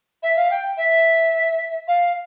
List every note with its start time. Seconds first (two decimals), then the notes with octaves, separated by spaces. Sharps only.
0.23 E5
0.36 F5
0.51 G5
0.77 E5
1.88 F5